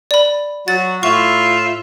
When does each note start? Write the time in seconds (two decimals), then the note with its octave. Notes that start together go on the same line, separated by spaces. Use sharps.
0.11 D5 B5
0.68 F#3 F#4 A6
1.03 A2 F4 E5 C#6